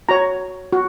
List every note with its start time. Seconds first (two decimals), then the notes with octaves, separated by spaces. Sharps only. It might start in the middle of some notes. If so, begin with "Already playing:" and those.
0.09 F#4 C#5 A#5
0.73 F#4